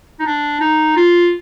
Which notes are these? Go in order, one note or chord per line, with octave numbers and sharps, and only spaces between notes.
D#4
D4
D#4
F4